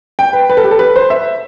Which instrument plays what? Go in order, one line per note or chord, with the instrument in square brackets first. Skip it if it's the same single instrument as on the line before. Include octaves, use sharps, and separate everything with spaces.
[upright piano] G5
B4
B4
A4
G4
A4
B4
C5
E5